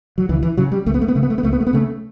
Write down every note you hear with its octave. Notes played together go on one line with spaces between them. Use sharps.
F#3
C#2 E3
E3
C#3 F#3
G3
C#2 A3
B3
A3
B3
C#3 A3
B3
A3
B3
C#2 A3
B3
A3
B3
C#3 A3